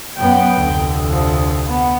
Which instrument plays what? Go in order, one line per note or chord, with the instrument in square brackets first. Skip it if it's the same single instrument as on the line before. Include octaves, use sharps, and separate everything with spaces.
[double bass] F#2 B3 [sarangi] G5
[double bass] F1 D2
[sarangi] F3
B3